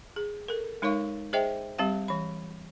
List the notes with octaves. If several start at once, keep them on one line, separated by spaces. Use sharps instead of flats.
G#4
A4 A#4
G#3 D#4 A#4 C#5 F5 C#6
G#4 C5 D#5 E5 G5
G3 C4 G4 F5
E3 B5